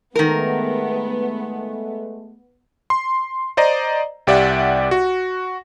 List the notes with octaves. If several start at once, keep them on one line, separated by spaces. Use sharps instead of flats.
D#3 G#3 A3 B3 A#4
C6
C5 D5 D#5 A#5
C2 G4 D5 E5 F#5
F#4